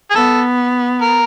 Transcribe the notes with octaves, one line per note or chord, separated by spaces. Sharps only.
G#4
B3 A4
A#4